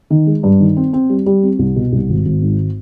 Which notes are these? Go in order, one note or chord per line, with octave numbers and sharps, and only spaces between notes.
D#3
G#3
G2
D#3
C4
C4
G3
G3
C4
C2
B2
C2
G#1
G#1
G#2